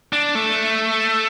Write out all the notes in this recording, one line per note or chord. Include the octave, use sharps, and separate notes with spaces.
D4
A3